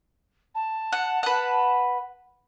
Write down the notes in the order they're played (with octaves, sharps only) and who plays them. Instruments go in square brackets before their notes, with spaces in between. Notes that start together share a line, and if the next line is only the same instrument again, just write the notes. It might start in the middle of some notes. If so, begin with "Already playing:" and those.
[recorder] A5
[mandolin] F#5
B4 F#5